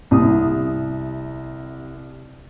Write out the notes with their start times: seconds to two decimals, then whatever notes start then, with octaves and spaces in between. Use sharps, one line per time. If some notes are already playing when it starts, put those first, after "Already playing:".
0.11 C2 C3 D#6